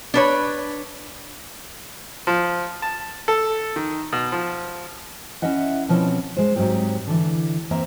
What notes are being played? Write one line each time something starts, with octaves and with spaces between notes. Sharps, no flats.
D4 B4 C#5
F3
A5
A4
D#3
B2
F3
C#4 E4 D#5 E5 F#5
B2 F3 C4 C#4 E4
G#3 C5
G#2 F#3 C4 G4
D3 E3
E2 A#3 C4 C5 E5 A#5